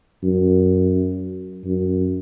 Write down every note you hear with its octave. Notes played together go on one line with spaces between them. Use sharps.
F#2
F#2